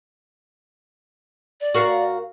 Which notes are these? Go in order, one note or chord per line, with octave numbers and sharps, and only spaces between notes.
D5
F#4 A#4 F5